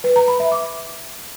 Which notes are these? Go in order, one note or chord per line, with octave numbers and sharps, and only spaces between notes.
B4
A#5
B5
E5
D6